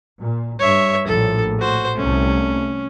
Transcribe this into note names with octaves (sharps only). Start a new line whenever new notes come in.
A#2
G2 C#5 E5
A#1 A2 A4
F#4 C5
C2 A3 C#4